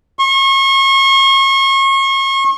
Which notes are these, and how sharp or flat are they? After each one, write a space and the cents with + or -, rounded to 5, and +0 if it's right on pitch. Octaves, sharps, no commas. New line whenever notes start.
C#6 -35